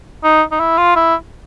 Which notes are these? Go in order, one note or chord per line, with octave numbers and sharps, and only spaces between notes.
D#4
D#4
E4
F4
E4